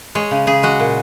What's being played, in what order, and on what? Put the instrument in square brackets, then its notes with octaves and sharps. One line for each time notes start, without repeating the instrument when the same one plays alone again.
[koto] G#3 C#5
C#3
C#3 G#4
G#3 F#4
A#2